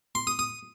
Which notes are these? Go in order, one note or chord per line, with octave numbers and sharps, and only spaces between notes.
C6
D#6
D#6